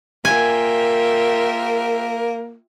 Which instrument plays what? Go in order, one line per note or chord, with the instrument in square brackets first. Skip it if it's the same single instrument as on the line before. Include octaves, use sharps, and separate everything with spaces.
[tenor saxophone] A#3 [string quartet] F4 E5 G5 [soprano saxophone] A#4 [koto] G#5